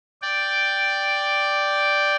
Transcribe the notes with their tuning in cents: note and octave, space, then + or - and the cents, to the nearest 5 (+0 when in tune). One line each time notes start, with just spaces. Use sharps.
D5 +0 G5 +0